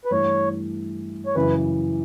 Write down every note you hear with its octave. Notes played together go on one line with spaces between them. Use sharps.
B4
G2 E3 A3 C#5
C#5
F#2 C#3 E3 B4